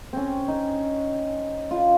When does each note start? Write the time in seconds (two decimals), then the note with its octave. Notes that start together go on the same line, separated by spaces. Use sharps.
0.13 C4 C#4
0.48 D#4
1.71 F4